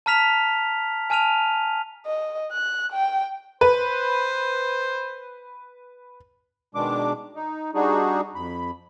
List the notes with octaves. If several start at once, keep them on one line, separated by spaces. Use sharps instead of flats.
A5 A#5 F6 B6 F7
G#5 A5 F6 D#7 F7
D#5
F#6
G5
B4 C5
B2 D#3 G#3 D4 D6
D#4
G3 D4 D#4 F#4 G#4
F2 B5